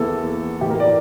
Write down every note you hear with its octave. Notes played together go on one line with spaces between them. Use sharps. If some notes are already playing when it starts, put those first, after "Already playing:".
Already playing: E2 E3 A#3 A4
A2 E3 A3 G4
A#4
D5